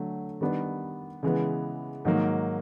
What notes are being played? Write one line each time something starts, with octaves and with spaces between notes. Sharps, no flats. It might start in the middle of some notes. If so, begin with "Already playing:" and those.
Already playing: D3 F#3 A3
D#3 G3 B3 D4
C#3 E3 G#3 B3
G#2 D#3 F#3 A#3